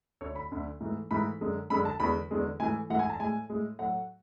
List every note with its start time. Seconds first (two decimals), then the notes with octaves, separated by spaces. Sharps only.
0.21 D2 D3 A3 C#5
0.36 B5
0.51 D2 D3 A3
0.81 G#2 E3 A3
1.11 G#2 E3 A3 B5
1.41 F#2 D3 G#3
1.70 F#2 D3 G#3 B5
1.85 A5
2.00 E2 D3 G#3 B5
2.31 E2 D3 G#3
2.60 G#2 E3 A3 G#5
2.90 G#2 E3 A3 F#5
2.99 G#5
3.10 A5
3.20 A2 G#3 G#5
3.50 A2 G#3
3.79 A2 F#3 A3 F#5